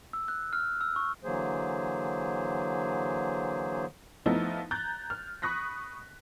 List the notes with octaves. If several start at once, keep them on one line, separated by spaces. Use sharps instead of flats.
E6
F#6
F6
E6
C#6
D3 E3 F#3 A#3 G#4 C5
F3 A3 B3 D#4 E4
A#5 F#6 G6 A6
F6
B5 C#6 D#6 F#6 A#6 B6